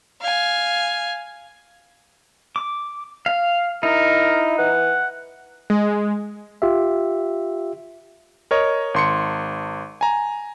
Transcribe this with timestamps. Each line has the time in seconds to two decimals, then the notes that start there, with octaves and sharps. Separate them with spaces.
0.21 F5 G#5
2.56 D6
3.26 F5
3.83 D#4 E4 A#4
4.58 E3 F#5
5.70 G#3
6.62 F4 G4 E5
8.51 A#4 C#5 D#5
8.94 G#1 C6 C#7
10.01 G#5 A#5